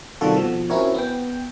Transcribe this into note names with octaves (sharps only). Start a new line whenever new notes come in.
C3 D#3 G3 F4 F#4 A4
B2 F3
C4 C#4 E4 F#4 A#4 C#5
B3 G5